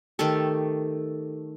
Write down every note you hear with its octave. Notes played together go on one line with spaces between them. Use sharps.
D#3 A3 G4 A4